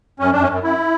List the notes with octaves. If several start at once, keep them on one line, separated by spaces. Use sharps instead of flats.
F#2 C#4
F#2 D4
C#4
F#2
F#2 E4